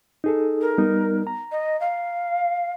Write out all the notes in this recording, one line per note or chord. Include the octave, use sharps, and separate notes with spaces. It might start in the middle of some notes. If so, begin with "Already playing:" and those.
D#4 G#4 A4
A#4
G3 B3 D#4
A#5
D#5
F5